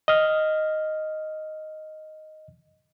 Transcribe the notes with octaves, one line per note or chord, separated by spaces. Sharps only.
D#5 F6